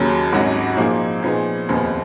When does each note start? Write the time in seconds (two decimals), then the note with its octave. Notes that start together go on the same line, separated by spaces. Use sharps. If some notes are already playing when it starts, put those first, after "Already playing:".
Already playing: D#2 C#3 F#3
0.32 G#1 G#2 F#3 C#4 F#4
0.77 A#2 F3 A#3 D#4 G#4
1.23 A#2 F3 B3 D#4 G#4
1.69 F1 D#2 C#3 F3 B3